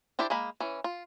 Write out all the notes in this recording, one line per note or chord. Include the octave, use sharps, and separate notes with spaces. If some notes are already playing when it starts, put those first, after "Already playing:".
D4 E4 G4 A4 C5
G#3 A#3 B5
E3 C#4
F4